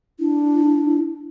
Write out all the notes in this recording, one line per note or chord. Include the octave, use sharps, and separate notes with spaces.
D4 E4